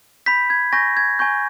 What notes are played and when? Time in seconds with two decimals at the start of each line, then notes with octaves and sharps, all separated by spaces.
0.26 B5 G6 B6
0.50 G#6
0.73 G#5 C#6 G6 A#6
0.97 G#6
1.19 G#5 C#6 G6